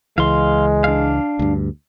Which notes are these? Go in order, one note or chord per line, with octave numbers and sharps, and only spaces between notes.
C#2 E3 G#3 F5 C6
D4 F5
D2 G2